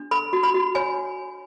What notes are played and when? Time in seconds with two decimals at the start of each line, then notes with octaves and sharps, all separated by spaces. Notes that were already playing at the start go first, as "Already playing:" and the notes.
Already playing: D4
0.11 A4 B5
0.33 F#4
0.43 B5
0.54 F#4
0.75 C#5 G#5